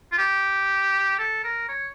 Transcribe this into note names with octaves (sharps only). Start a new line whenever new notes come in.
F4
G4
A4
A#4
C#5